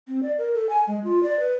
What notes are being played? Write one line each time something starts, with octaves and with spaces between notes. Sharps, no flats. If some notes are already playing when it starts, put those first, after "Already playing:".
C4
D5
A#4
A4
G#5
G#3
F4
D5
B4